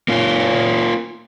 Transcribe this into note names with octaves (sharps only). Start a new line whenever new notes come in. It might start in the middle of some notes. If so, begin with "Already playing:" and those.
A#3 C#4 F4